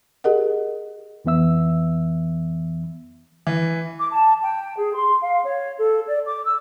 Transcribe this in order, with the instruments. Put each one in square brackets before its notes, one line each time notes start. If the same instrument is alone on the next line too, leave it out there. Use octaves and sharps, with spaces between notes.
[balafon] G4 G#4 A#4 D#5 F#5
[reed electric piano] F2 E3 B3 E5 E6
[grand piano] E3
[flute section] D6
A5
G5
G#4
C6
F5
C#5
A4
D5
D6
E6